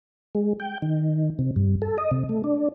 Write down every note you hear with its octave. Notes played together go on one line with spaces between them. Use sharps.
G#3
G5
D#3
C3
G2
A4
D#5
C3
A3
D4